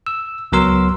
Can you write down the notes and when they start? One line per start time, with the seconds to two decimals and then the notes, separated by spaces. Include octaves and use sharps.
0.07 E6
0.52 C#2 F#3 B3 A#4 C6 E6